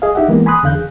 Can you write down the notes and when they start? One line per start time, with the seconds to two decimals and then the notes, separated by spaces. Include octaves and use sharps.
0.02 G#4 D#5 F5
0.15 D#4 G4 E5 F#5
0.28 E3 G#3 A#3 B3
0.46 G#5 B5 C6 D#6 F#6
0.63 E2 D3 F5 F#6 G6
0.75 G#4